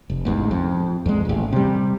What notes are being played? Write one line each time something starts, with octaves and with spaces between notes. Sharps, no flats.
F1
A1 E2 G#2
F2
E2 G#3
D#1 A1
C3 G3